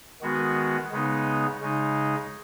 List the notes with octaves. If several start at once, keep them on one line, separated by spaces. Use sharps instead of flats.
D#3 G#3 B3 F#4
C#3 G#3 B3 D#4
C#3 G#3 D#4